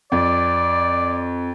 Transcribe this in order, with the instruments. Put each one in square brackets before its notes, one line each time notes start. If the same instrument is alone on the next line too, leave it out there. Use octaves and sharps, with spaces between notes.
[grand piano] F2 [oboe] D5